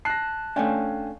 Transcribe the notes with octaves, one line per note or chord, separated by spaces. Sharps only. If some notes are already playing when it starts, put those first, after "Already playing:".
A5 F#6 A#6 C7
A3 C#4 D4 F5 G5 G#5